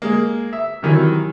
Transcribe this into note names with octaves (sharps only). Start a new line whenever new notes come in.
G#3 A#3
E5
C3 D#3 E3 F#3